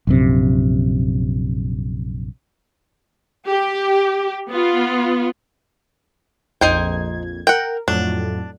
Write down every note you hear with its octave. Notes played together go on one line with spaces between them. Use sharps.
A#1 F#2 C3
G4
B3 F4
A#1 F2 D#4 C5 G5 G#6
A#4 F#5 G5
F2 A2 F#3 D4